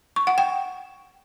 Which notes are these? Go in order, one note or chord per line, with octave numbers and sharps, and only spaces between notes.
C#6
F#5
G5